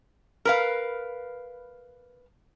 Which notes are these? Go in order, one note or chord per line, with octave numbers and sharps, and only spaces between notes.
A#4 B4 F5